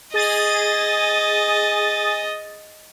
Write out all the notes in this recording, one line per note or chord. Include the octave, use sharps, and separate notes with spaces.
G#4 D#5 D#6 A6